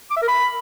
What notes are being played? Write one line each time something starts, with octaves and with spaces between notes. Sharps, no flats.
D6
E5
A#4
B5